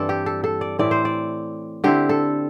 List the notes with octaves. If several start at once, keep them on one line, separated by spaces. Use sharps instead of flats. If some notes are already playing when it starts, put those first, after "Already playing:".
Already playing: G2 E3 C4 E4 A4 D5
G4
A4
A4
D5
A2 E3 C4 E4 D5
C5
D5
D3 C4 E4 G4
A4